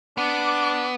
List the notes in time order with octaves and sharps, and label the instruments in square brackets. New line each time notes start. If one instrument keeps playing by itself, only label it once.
[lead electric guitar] B3 [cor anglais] D4 [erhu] D6